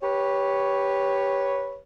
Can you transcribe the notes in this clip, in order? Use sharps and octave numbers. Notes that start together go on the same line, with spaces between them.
G4 B4 C#5